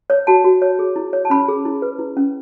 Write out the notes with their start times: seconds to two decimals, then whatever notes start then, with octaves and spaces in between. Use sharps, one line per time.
0.10 C#5
0.27 F#4 A5
0.44 F#4
0.62 C#5
0.79 G#4
0.96 E4
1.13 C#5
1.25 A5
1.30 C#4 B5
1.48 G#4
1.65 E4
1.82 B4
1.99 E4
2.17 C#4